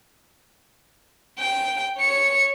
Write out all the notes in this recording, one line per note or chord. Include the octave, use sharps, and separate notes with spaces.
G5
C#5 C#7